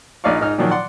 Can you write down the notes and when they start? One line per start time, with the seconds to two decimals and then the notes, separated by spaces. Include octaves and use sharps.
0.24 A#1 D#4 D5 F5 C#6
0.41 G#2 D#4 F6
0.58 A#2 D#3 F3 F#3
0.71 D5 F#5 C6